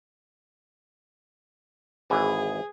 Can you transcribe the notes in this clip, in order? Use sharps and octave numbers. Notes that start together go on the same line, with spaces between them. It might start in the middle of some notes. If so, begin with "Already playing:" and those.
G#1 E3 G#4